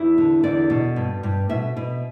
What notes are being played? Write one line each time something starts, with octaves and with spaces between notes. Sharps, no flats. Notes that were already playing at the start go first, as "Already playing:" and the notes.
Already playing: E2 E4
D3
E2 D5
B2
G2
G2
B2 E5
B2